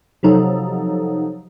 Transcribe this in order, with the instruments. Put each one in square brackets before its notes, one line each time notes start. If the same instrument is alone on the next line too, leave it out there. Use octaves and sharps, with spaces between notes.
[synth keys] C3 F3 F#3 D#4 A4